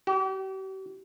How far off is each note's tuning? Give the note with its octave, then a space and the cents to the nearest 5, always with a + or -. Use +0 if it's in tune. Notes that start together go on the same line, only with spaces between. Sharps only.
G4 -40